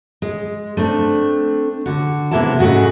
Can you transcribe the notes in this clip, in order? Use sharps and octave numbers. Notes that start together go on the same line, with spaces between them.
G#3
A3 C4 D4
D3 F#4
C3 G#3 A#3 B3 E4 A5
G#2 C#3 A3 F#4 G#4